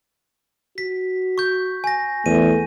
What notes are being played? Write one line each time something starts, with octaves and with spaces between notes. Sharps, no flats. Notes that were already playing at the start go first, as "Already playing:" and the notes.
F#4 B6
C#6 G6
G#5 A#6
E2 A3 D#7